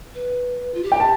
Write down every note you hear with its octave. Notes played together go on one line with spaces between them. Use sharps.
B4
F4
G4
G5
A5